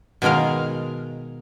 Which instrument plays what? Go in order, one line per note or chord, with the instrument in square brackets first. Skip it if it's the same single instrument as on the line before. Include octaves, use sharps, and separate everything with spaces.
[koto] B2 D#3 G#3 A#4 F5